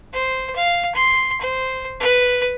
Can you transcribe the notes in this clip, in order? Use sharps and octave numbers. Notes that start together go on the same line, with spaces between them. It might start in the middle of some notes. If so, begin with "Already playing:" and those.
C5
F5
C6
C5
B4